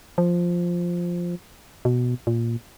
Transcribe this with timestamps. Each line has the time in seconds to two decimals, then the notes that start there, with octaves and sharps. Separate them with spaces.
0.18 F3
1.85 B2
2.27 A#2